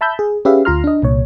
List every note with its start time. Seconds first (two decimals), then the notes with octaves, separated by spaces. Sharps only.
0.01 E5 A5 B5 E6 G6
0.19 G#4
0.45 C#4 G4 G#4 B4 E5 F5
0.65 D2 F4 A#5 C6 F6
0.84 D4 D#5
1.02 C2 A#2 C#5